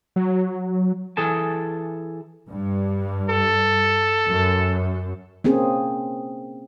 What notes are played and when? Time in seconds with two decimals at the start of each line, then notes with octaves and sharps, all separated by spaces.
0.16 F#3
1.17 E3 G#4 A4 A5
2.49 G2
3.30 A4
4.26 F#2
5.44 A#3 C4 C#4 G#4